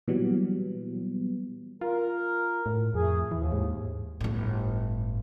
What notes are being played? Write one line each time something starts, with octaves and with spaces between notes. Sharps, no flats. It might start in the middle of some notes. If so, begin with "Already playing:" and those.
A#2 E3 F#3 G3 B3
F4 A#4
A2
F2 A3 G#4
D#2 E3
G#2
G1 A2